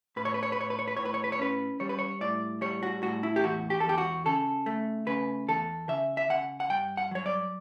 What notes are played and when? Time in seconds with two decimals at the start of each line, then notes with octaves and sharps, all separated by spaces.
0.16 A2 B4
0.25 C#5
0.34 B4
0.43 C#5
0.52 B4
0.57 A2 C#5
0.70 B4
0.79 C#5
0.88 B4
0.97 A2 C#5
1.05 B4
1.14 C#5
1.24 B4
1.32 C#5
1.39 C#4 B4
1.80 G3 C#5
1.89 B4
1.99 C#5
2.21 A2 D5
2.61 G3 C#5
2.83 F#4
3.02 A2 F#4
3.23 E4
3.36 G4
3.43 E2 F#4
3.70 G4
3.80 A4
3.85 E2 G4
3.98 F#4
4.26 C#3 A4
4.66 A3
5.06 C#3 B4
5.48 E2 A4
5.89 C#3 E5
6.17 E5
6.30 C#3 F#5
6.60 F#5
6.70 G2 G5
6.97 F#5
7.11 F#3 C#5
7.26 D5